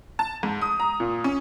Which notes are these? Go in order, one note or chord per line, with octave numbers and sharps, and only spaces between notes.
A5
G#2
D#6
A#5
A#2
C#4